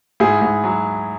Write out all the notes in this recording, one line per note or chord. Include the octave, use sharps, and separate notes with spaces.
G#2 E4 G#4
G#2
F#3